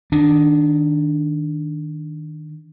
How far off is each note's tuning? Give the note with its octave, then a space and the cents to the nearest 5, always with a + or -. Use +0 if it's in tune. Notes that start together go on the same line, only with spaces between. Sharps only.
D#3 +0 D4 +0